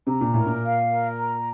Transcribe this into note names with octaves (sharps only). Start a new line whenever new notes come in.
C3 A#5
A#2
A2 A#4
A#2
F5
A#4
A#5